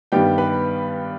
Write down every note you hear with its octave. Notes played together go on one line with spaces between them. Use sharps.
G2 D#3 G3 B3 G4 G5
B4 B5